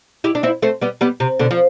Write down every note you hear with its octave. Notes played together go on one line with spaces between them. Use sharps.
E4 G4
D4
C4 E4
A3 C4
G3 B3
G3 B3
C3
B2 D3
F3